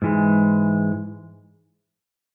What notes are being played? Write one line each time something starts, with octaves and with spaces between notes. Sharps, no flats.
G#2 E3 G#3